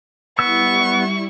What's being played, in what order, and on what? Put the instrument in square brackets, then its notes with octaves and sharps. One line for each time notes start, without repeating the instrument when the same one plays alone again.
[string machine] G3 E4 [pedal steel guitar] B3 E6 [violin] C#6